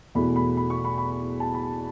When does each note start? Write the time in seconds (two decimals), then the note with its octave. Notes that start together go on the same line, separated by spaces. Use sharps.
0.15 E2 B2 A3 B5
0.36 B5
0.57 B5
0.70 C#6
0.85 B5
0.98 B5
1.40 A5
1.54 B5